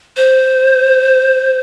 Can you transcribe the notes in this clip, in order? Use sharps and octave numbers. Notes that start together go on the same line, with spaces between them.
C5